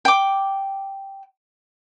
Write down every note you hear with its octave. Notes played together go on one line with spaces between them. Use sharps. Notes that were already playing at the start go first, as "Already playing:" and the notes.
G5 D6